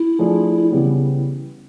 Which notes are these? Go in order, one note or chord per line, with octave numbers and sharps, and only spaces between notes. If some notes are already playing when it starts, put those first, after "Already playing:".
Already playing: E4
F3 A3 D4 F4 G#4
C#3 E3 G3 B3